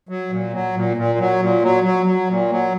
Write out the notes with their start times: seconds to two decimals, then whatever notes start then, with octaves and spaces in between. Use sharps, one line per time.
0.09 F#3
0.30 A#2
0.53 F#3
0.75 A#2
0.97 A#2
1.19 F#3
1.41 A#2
1.62 F#3
1.84 F#3
2.06 F#3
2.28 A#2
2.51 F#3